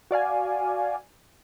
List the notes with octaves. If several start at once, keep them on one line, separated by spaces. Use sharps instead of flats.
F#4 D5 F5 G#5